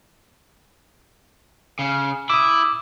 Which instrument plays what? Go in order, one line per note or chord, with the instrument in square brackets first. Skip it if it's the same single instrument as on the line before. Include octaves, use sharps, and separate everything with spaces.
[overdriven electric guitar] C#3
[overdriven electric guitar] E4 [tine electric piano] D6 D#6